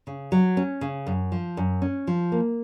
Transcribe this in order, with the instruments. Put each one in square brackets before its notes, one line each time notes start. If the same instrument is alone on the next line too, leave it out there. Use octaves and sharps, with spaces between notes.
[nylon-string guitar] C#3
F#3
C#4
C#3
F#2
F3
F#2
C#4
F3
A#3